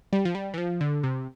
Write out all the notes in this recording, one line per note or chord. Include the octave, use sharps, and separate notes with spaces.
G3
F3
G3
E3
F3
D3
C3